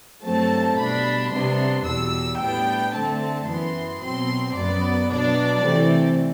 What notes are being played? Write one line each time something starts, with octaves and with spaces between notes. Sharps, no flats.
G2 F#3 A3 C4 A5
B2 G3 D4 B5
C3 G3 B3 D4 C6
E2 B2 G3 E6
A2 G3 B3 D4 G5
D3 A3 C4 A5
F#2 E3 B3 C6
B2 F#3 C4 C6
F#2 F#3 B3 D5
B2 F#3 B3 D4 D5
C3 E3 A3 C4